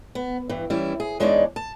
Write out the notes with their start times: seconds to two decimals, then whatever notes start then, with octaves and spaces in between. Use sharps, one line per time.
0.15 B3
0.49 G2 E3
0.70 E3 G3 C#4 E4
1.00 G#4
1.20 E2 G#3 D4 D#4 C#5 D5
1.56 A5